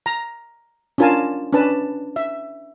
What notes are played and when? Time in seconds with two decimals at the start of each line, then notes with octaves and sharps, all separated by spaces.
0.06 A#5
0.98 C#4 D4 F4 A#4 G#5 A5
1.52 C#4 D4 B4 A5
2.16 E5